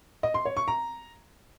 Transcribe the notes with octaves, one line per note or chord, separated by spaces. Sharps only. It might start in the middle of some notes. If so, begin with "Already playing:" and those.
D#5
C6
C#5
C#6
A#5